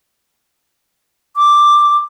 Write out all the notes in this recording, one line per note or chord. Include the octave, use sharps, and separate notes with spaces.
D6